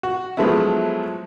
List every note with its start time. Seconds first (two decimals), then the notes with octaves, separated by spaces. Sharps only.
0.03 F#4
0.37 F3 F#3 G#3 A3 B3 E4